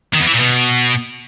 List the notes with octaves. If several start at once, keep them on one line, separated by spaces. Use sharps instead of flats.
D#3
E2
E3
A#2
B2